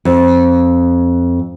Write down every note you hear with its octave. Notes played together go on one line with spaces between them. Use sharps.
F2